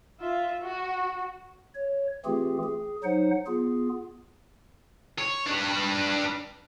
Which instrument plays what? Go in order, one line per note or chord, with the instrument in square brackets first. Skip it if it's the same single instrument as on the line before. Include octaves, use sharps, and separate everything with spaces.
[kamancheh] F4 E5
F#4
[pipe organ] C#5
E3 A3 C4 F4 G4 G#4
G#4
F#3 D#4 C5 F#5
B3 F4 G#4
[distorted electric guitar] C#5
D4 B4